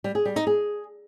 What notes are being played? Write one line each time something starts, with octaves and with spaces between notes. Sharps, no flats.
G3
G#4
G3
D#4
G#4